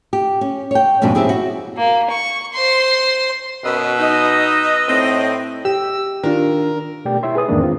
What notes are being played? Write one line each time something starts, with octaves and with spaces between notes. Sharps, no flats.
G4
C#4
C#5 G5
F2 G#2 B2 C#4 D4
C4 E4 G4 G#4
F#4
A#3
C#6
C5 C6
F#2 B2 B4 D#5 E6
D#4 D#5
A2 C4
G4 E6
D#3 D4 F4 A#4
B2 A3 G4 D5 G5
E4 C#5 E5 C6
G#4 B4 D#6
E2 G#2 D#3 G#3 A#3 D4
C4 F4